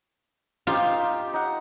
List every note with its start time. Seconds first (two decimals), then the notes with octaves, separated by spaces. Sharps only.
0.67 D#4 F4 G4 C5
1.33 D#4 F#5